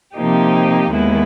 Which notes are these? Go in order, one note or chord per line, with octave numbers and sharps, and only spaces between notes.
C3 F3 A#3 D#4 G4
D#2 D#3 G#3 B3 E4